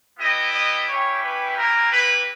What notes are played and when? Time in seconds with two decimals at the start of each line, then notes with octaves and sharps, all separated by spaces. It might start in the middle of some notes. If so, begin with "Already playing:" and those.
0.18 B3 E4 G4 D#5
0.53 D#5
0.88 G3 C#4 E4 G4 C#5
1.23 B4
1.57 A#3 E4 G4 A#4
1.92 B4